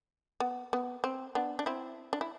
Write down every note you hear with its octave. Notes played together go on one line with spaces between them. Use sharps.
B3
B3
C4
B3 D4
D4
C4 E4
D4
E4